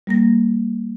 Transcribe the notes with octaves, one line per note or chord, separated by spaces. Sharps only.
G3 A#3 A#6